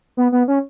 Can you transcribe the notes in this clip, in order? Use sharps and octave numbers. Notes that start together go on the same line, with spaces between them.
B3
B3
C#4